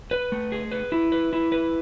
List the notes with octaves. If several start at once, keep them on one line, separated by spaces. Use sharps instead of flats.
B4
A3
G#4
B4
E4
B4
E4
B4